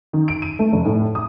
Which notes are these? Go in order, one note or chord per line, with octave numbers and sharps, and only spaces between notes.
D#3
D7
D#7
A3
F1
A2
D#6